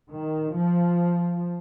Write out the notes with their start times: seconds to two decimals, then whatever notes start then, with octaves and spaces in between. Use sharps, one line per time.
0.10 D#3
0.53 F3